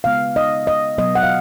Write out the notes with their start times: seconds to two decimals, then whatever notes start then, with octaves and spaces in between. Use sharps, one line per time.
0.04 C#3 G#3 B3 F5
0.36 D#5
0.67 D#5
0.98 B2 F#3 B3 D#5
1.15 F#5
1.23 F5